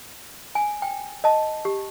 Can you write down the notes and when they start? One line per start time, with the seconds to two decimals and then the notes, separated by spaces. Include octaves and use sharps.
0.55 G#5
0.82 G5
1.24 D#5 A5
1.65 G4